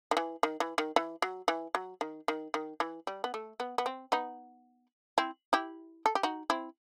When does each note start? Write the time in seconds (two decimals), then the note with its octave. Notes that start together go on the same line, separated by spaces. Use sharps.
0.11 D#3
0.17 E3
0.43 D#3
0.60 E3
0.78 D#3
0.96 E3
1.22 F#3
1.48 E3
1.75 F#3
2.01 D#3
2.28 D#3
2.54 D#3
2.80 E3
3.07 G3
3.24 B3
3.34 A3
3.60 B3
3.78 B3
3.86 C4
4.12 B3 D#4
5.18 C4 E4
5.53 E4 G4
6.06 A4
6.15 G4
6.23 D#4 F#4
6.50 C4 E4